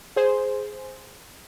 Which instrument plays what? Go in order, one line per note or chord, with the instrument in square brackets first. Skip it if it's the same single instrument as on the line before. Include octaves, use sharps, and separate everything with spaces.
[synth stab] G#4 C5